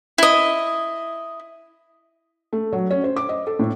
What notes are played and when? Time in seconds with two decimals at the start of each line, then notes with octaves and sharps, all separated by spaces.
0.18 E4 D#5
2.53 A3
2.73 F#3
2.91 C#4
3.04 C5
3.16 D6
3.29 D#5
3.47 A4
3.59 A2